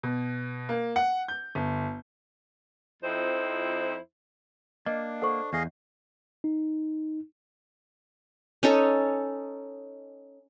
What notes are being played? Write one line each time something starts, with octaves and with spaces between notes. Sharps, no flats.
B2
A#3
F#5
G6
G1
F2 F3 C4 D#4 E4 C5
A#3 D4 D#5
A4 C5 F#5 C#6
E2 G#4 D#5 F5
D#4
C#4 D#4 A4